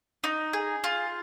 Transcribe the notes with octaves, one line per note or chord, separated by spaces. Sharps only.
D#4
G#4
F4